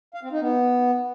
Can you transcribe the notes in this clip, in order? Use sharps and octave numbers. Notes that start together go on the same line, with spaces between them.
F5
C4
D#4
B3